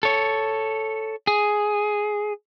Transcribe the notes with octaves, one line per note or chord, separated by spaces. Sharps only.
A4 C#5
G#4